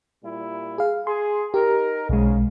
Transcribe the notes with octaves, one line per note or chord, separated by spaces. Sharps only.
A#2 G3 E4
G#4 F5
G#4 C6
D#4 G4 A#4
B1 G#2 C#3 G#3